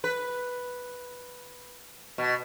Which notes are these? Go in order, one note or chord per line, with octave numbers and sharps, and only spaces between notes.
B4
B2